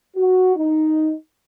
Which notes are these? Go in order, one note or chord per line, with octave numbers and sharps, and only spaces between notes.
F#4
D#4